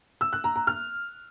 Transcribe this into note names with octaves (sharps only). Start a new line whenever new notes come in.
E6
F#6
A#5
A#5
F6